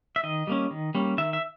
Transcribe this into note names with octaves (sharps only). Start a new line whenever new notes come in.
E5
D#3 D#5
G3 A#3 C#4
D#3
G3 A#3 C#4
D#3 E5
E5